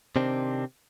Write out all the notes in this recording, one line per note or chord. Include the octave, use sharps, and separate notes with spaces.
C3 D#3 C4 D4